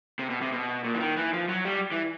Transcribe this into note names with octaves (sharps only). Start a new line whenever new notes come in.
C3
B2
C3
B2
A#2
E3
D#3
E3
F3
F#3
G3
E3